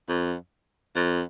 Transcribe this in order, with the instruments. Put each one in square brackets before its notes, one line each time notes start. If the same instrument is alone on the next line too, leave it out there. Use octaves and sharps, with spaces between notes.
[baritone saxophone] F2
F2